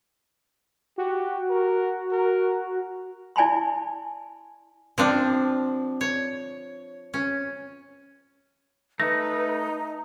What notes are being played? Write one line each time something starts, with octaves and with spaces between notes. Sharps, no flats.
F#4 G4
A#4
A#4
E4 D5 G#5 A5 B5 C6
F3 C4 D4
C#5
C#4
A3 D#4 B4 A#6